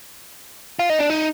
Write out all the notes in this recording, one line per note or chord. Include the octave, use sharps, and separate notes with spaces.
F4
D#4
D4
D#4